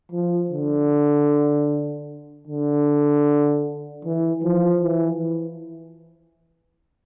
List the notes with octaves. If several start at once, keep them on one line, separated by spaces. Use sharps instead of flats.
F3
D3
D3
E3
F3
E3